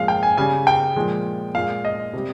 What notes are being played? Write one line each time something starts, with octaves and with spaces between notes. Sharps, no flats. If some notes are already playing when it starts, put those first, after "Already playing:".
Already playing: A#2 F3 G#3 F5
G5
G#5
C#3 G3 G#5
G5
A#2 F3 G#3
A#2 G#3 F5
D#5
C3 G3